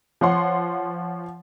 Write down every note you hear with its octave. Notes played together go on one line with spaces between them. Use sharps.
F3 C#5 F#5 C6